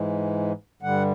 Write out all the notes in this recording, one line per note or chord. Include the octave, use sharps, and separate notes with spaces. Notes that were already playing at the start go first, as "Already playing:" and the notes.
Already playing: G#2 E3 G#3
G2 D3 G3 F#5